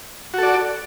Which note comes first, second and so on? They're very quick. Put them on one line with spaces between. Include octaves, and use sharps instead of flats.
F#4 A4 D5